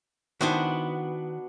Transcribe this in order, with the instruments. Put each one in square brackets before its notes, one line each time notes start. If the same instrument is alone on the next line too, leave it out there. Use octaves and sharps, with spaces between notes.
[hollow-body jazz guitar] D#3 E4 C5 [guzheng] B3 D4 F#4